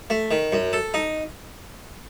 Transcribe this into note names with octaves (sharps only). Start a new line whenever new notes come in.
A3
D#3
F#2
A4
D#4